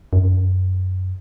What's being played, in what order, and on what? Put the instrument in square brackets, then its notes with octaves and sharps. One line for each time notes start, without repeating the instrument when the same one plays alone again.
[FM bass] F#2